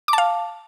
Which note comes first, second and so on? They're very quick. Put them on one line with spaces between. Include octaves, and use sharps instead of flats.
D6 A5 F5